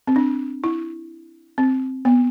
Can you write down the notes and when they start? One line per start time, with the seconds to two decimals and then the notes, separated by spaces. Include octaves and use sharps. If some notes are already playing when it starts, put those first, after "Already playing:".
0.07 C4
0.16 D4
0.64 E4
1.58 C4
2.05 B3